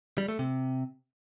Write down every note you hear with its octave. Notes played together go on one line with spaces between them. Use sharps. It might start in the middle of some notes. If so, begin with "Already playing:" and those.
G3
A3
C3